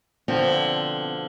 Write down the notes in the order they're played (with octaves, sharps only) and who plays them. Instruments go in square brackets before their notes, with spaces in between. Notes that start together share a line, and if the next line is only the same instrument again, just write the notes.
[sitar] B2 D3 F3 [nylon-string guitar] C4